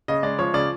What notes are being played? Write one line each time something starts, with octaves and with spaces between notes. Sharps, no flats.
C#3 D#5
G#3 D5
F3 C#5
C#3 D5